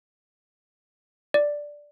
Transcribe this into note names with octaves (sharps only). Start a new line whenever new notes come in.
D5